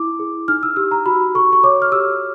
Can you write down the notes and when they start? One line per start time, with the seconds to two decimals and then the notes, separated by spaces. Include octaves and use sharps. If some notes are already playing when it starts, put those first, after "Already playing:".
Already playing: E4 D6
0.20 G#4
0.48 D#4 F6
0.63 E6
0.76 G4 E6
0.91 A#5
1.06 F#4 B5
1.34 A4 C#6
1.53 C#6
1.64 C#5 D6
1.82 F6
1.92 G4 E6